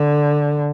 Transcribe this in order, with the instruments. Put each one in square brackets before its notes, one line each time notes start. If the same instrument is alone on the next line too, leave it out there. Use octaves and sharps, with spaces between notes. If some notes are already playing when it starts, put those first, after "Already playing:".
Already playing: [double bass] D3